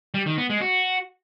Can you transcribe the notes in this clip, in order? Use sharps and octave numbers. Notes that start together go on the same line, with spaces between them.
G3
D#3
B3
G#3
F#4